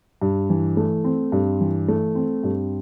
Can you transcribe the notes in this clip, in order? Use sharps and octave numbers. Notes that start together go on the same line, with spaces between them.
G2
E3
A3
C4
G2
E3
A3
C4
G2